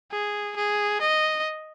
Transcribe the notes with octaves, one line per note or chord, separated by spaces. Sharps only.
G#4
G#4
D#5